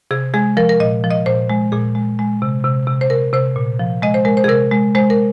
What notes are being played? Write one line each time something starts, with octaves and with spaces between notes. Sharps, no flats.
C3 G#4
G#3 G#4
F3 A#4
A#4
A#2 D#5
F3
D#5
A#2 C5
G#3
A#2 G#4
G#3
G#3
C3
C3
C3
C5
C3 A#4
C3 C5
A#2
F3
G#3 D#5
C5
G#3 A#4
C5
G#4
C3 A#4
G#3
G#3 C5
A#4